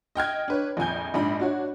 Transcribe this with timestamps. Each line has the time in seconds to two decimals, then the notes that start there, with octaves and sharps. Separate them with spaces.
0.15 D#5 G5 F6 G#6
0.48 D4 B4 C#5
0.77 A#1 F2 G#5 G6
1.14 A#1 G#2 D4 B5
1.39 D4 F#4 C#5